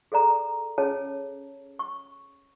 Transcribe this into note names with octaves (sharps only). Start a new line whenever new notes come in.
G#4 A4 D5 A#5
C#4 G#4 C#5 A5
C#6